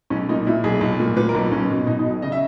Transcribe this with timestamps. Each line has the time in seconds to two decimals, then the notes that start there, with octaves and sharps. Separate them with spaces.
0.10 B1 C#4
0.29 A#2 D#4
0.47 A#2 E4
0.64 B1 G#4
0.81 B1
1.00 A#2
1.16 A#2 B4
1.29 A#4
1.35 B1
1.51 B1 C#4
1.70 B2
1.87 B2 D#4
1.99 D#4
2.06 B1
2.22 C#3 D#5
2.32 E5